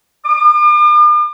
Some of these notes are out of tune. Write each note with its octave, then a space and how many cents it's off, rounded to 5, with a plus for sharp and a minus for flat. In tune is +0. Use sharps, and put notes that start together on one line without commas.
D6 +45